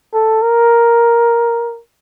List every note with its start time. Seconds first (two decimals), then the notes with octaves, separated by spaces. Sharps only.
0.14 A4
0.42 A#4